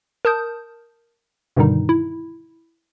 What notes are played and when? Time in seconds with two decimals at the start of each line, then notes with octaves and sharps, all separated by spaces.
0.25 A#4 A5 D#6 G6
1.57 G2 B2 D3 D#3 G3 D#4
1.89 E4